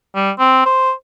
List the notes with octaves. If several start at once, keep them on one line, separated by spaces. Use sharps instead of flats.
G3
C4
C5